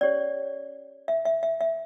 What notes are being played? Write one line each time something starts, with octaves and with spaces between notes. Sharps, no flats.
C#4 G4 C#5 D5
E5
E5
E5
E5